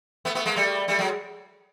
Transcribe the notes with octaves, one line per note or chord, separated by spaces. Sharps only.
A3 B3
A3 B3
G#3 A#3
G3 A3
G3 A3
F#3 G#3